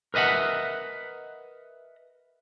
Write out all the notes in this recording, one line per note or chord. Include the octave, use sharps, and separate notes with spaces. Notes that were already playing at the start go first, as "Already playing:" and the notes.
A#4 B4 D#5 E5 F#5